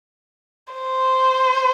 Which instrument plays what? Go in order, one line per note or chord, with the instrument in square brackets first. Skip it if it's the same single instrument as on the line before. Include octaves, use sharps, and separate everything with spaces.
[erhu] C5